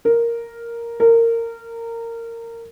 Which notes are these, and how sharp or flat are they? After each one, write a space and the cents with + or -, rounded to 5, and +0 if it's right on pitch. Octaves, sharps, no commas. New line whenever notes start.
A#4 +0
A#4 -20